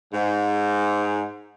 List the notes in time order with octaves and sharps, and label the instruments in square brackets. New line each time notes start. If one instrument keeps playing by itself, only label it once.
[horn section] G#2